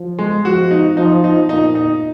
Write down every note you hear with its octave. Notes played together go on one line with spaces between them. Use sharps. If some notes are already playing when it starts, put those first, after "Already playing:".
Already playing: F3
G#3
F3 F#4
D#4
F3 D#4
D#4
A#2 D#4
D#4